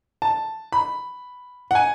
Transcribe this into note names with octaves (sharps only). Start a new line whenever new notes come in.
A5
B5
F#5
G#5